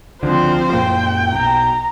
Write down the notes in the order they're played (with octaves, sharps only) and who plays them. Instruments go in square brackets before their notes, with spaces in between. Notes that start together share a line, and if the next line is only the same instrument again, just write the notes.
[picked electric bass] C#2 D3 [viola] F3 C4 [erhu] C5
[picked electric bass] F#2 A#2 A#3 [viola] G5
[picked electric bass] B1 [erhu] A#5